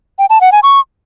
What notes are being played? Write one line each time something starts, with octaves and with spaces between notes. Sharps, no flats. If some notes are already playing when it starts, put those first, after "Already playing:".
G5
A5
F#5
G#5
C#6